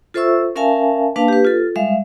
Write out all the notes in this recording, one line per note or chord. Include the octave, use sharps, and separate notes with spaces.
F4 A4 C5 E5 C#6 E6
C#4 A#4 E5 F5 G#5 A5
A#3 D4 B4 F5 A5
G4 B4
F4 A4
G3 G#3 E5 F5